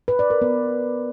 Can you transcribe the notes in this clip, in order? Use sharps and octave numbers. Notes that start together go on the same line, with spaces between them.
B4
D5
A#4
B3